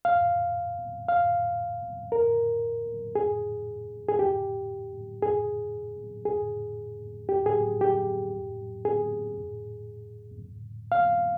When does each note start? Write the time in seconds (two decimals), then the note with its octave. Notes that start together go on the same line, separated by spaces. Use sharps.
0.05 F5
1.08 F5
2.12 A#4
3.15 G#4
4.09 G#4
4.19 G4
5.22 G#4
6.25 G#4
7.29 G4
7.46 G#4
7.81 G4
8.85 G#4
10.92 F5